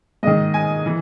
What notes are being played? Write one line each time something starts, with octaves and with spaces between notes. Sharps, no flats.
G#2 D#3 D#5
G#5
E3